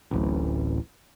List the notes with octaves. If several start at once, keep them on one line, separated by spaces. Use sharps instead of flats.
D1 A1